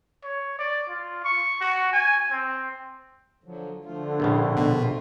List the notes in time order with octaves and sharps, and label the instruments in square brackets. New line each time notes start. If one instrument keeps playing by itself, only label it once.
[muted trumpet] C#5
D5
F4
C#6
F#4
G#5
C4
[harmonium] D3 F3 F#3
[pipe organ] D3 [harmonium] F3 A3 F4
[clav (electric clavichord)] A#1 A2 C#3
[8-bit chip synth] B2